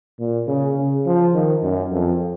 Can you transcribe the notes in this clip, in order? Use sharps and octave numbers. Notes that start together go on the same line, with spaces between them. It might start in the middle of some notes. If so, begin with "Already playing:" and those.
A#2
C#3
C#3
F3
D#3
F#2
F2